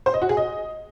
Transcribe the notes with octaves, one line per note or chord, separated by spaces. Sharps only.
C5
D#5
F#4
G#4
D#5